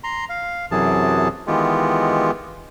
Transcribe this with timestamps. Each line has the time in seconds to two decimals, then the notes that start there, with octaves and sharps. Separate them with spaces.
0.04 A#5 C6
0.29 F5
0.71 F#2 C3 E3 F#3 G#4 A5
1.47 D#3 E3 G#3 B3 F4 G4